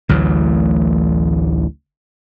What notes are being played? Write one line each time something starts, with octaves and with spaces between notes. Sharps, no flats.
A1 D2 E3 F#3